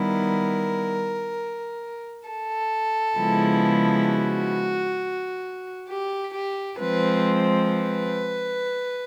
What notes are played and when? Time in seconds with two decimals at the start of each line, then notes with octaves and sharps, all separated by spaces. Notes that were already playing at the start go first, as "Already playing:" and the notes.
Already playing: D#3 G3 B3 E4 A#4
2.29 A4
3.19 C#3 F3 G#3 B3 E4
4.09 F#4
5.89 G4
6.35 G4
6.80 F3 G#3 C4 B4
7.71 B4